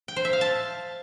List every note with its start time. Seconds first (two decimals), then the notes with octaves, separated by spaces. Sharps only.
0.08 G5
0.16 C5
0.25 E5
0.33 F5
0.41 A5